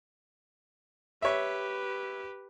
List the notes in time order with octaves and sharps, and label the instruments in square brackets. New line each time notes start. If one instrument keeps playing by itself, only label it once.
[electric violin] G4 B4 [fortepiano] C#5 E5